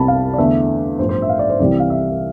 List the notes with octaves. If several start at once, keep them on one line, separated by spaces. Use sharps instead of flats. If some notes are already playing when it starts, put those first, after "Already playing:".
Already playing: C2 C3 G3 B3 A5 B5
F5
D5
E2 D3 A3 E5
A1 G2 F3 B3 C5
C5
E5
F5
D5
C5
C2 C3 E3 G3 D5
F5
E5